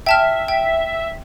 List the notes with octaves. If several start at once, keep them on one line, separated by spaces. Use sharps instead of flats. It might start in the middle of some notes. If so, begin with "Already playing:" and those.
E5 G5 A5 F6
G5